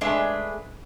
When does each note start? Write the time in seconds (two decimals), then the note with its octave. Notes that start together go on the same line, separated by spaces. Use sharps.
0.01 G#3 A3 D4 G#4 B4 E5